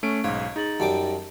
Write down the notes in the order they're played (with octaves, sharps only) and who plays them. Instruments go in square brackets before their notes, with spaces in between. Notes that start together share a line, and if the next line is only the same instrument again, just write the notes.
[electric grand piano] A3 C#4 D7
[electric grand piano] B1 G#2 [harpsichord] C#5 [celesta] F5
[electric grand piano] D#4 [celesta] G#4 A6 F#7
[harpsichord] F#2 G3 D6 [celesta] A5